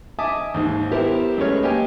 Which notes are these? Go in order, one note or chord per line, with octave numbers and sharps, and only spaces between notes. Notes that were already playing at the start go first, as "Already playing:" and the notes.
D#5 E5 G#5 A5 D6 D#6
D#2 G#2 D#3
B3 E4 G4 A#4 C5
F#2 G#3 A3 B4 C#5 F6
A#3 G4 D#5 G5 G#5